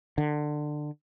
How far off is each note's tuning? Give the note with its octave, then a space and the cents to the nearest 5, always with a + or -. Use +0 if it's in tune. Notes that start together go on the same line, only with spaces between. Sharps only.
D3 +20